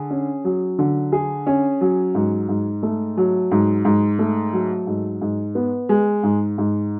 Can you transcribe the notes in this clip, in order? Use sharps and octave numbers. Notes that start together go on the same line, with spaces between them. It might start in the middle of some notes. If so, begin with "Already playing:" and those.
Already playing: D3 G#4
C#4
F#3
D3
G#4
C#4
F#3
G#2
G#2
A3
F#3
G#2
G#2
A3
F#3
G#2
G#2
B3
G#3
G#2
G#2